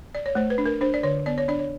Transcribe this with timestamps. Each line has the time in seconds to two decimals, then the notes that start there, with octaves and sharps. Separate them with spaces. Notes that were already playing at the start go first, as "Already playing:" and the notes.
0.15 D5
0.26 C#5
0.35 A3 C5
0.50 B4
0.58 D4
0.66 A#4
0.81 D4 C5
0.94 D5
1.03 D3 C#5
1.26 B3 D5
1.38 C#5
1.48 D4 D5
1.59 C#5